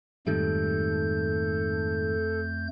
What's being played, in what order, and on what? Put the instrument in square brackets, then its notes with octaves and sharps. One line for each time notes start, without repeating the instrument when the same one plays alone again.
[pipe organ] F2 A3 G6 [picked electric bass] G#2 D#3 G3 [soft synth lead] A4